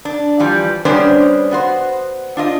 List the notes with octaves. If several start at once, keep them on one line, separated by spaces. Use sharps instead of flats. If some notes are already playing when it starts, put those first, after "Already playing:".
D4
E3 F3 G3
G3 B3 C#4 D4 C5
B3 F#4 C5
D4 F4 D#5